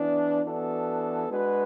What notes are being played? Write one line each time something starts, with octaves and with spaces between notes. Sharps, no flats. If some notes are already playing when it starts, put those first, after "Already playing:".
Already playing: E3 B3 D4
E3 B3 D4 F#4 A4
G#3 D4 F#4 B4